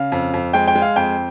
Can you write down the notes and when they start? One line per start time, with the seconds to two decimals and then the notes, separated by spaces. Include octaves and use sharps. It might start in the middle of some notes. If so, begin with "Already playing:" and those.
Already playing: C#3 F5
0.12 F2
0.34 F2
0.53 G#3 G5
0.67 G5
0.75 G#3
0.82 F5
0.96 F2 G5